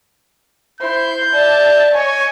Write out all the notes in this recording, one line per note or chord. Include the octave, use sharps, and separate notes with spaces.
E4 C5 C6 G6
D5 E5 A5
C#5 D#5 G#5